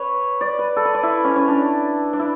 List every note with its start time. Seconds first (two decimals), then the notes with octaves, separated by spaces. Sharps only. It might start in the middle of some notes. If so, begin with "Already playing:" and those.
Already playing: B4 C#5
0.41 D5
0.59 B4
0.76 A4
0.85 B4
0.95 D5
1.03 E4
1.24 C#4
1.36 C#4
1.48 D4
2.13 D4
2.19 E4